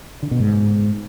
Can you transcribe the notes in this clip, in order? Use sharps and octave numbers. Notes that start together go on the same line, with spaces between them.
D3
B2
G#2